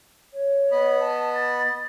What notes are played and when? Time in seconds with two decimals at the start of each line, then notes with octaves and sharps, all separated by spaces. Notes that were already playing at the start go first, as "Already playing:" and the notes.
0.33 C#5
0.72 B3 D#5 B5
1.00 A5
1.34 A6